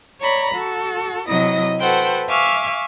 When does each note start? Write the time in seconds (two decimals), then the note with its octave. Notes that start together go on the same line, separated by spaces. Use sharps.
0.20 C#5 D5 A#5 B5
0.55 F#4 A4
1.28 C3 F#3 E4 D#5 D#6 A#6
1.80 F#4 A4 B4 C5 F#5 G5
2.28 E5 F5 G#5 C#6 D6 F6